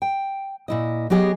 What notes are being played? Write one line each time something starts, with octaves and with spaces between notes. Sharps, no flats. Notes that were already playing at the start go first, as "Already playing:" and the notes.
G5
A#2 E4 D#5
F#3 B3 G4 G#4 D#5